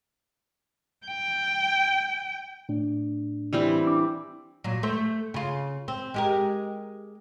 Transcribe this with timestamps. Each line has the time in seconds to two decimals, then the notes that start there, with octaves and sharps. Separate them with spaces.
1.06 G5
2.69 A2 D4
3.53 E3 G3 C4
3.87 D4 D6
4.64 A#2 F#3
4.83 A3 C5
5.34 C#3 F4
5.88 C4
6.14 G#3 G4 A#4